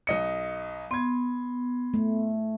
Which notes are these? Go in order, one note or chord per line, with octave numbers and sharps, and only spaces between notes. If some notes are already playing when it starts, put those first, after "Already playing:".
B1 D#5 C#7
B3 C6 G#6
A3